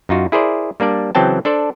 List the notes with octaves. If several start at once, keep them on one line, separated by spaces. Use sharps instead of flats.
F#2 D#4 F4 F#4
E4 G#4 A#4 C5 D5
G3 A#3 D4 D5
C#3 E3 F#3 C4 G5 A5
D4 A4 C5 D5